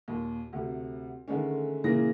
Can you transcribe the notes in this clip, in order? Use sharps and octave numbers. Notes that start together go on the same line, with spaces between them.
D#2 A#2
D2 C3
D3 D#3 G#3 A3 C#4
A#2 C#3 E3 A#3 A#6